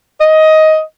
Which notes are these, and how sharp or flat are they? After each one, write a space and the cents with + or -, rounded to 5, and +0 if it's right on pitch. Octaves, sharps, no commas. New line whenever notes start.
D#5 +15